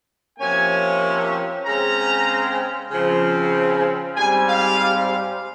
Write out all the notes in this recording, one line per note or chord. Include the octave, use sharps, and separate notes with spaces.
C3 F3 A#3 C#4 G#5
C#3 G#3 C4 A#5
C#3 F3 C4
G#2 G3 C4 G#5
F5